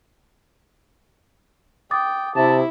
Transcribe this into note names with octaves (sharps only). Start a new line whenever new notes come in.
G5 D6 D#6 A6
C3 E4 A5